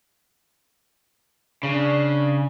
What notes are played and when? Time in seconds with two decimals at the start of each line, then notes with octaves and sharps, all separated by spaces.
1.63 C#3 D4